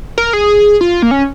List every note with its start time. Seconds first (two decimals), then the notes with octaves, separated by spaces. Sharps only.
0.18 A#4
0.33 G#4
0.81 F4
1.02 A#3
1.11 C#4